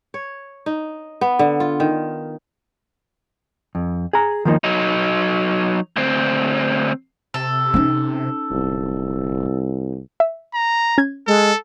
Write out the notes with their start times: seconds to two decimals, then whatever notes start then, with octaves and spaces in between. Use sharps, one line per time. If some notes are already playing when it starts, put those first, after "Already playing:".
0.14 C#5
0.66 D#4
1.21 B3
1.39 D3
1.60 F4
1.80 D#3
3.75 F2
4.13 G#4 A#5
4.45 D#3 F3 A#3 D#4
4.64 F#3 D#4
5.96 D2 C4
7.34 C3 A4
7.74 C#4 D#4
8.51 D1 C2
10.20 E5
10.54 A#5
10.98 C#4 G#6
11.27 G#3 A4